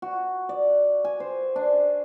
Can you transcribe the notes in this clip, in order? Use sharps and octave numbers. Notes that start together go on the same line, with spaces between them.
F#4
D5
G#5
C5
D4